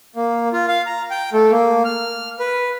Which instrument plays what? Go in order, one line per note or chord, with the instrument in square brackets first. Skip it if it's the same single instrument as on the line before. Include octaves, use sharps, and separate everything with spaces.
[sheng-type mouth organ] A#3
F4
F5
A#5
G5
A3
A#3
F6
B4